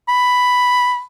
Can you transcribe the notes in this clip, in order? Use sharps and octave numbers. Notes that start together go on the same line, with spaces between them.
B5